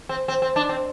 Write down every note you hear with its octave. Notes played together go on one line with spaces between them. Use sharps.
C4
C4
C4
D4
C4